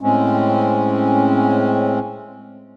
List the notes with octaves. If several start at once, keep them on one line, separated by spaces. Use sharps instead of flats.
A2 G#3 C4 C#4